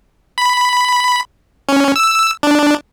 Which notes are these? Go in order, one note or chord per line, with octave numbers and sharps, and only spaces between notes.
B5
C#4
E6
D4